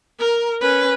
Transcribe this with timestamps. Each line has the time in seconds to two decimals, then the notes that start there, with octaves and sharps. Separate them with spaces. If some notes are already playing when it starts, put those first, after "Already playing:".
0.19 A#4
0.61 C#4 B4